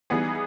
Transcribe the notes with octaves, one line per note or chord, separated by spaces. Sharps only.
E3 G3 B3 D#4 G#4